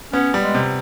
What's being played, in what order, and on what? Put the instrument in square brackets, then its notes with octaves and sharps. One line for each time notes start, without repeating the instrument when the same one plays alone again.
[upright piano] B3 [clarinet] C#4
[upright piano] G3
[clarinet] G#3
[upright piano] C3